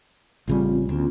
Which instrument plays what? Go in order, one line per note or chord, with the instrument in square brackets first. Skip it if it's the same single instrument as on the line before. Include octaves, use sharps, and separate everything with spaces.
[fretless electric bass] A1 C#3 G3 [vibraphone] C4 F4
[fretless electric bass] D2 [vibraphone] B3 C#4 F4